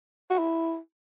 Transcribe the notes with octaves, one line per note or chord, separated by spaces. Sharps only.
F#4
E4